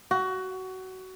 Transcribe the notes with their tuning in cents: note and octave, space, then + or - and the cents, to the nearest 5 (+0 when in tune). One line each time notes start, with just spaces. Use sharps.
F#4 +20